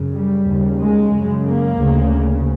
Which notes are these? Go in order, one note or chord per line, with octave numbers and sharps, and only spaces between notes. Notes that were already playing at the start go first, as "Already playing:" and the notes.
Already playing: F#2 C#3
G3
D#2 C#3
G#3
F#2 C#3
A#3
D2 C#3